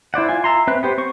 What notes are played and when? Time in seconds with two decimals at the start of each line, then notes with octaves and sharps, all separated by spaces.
0.14 E4 C5 D5 F#5
0.29 F4 G#5
0.44 E5 A#5 C6
0.67 C4 B4 E5 F#6
0.83 B3 G4 C5
0.98 C4 C5 C#6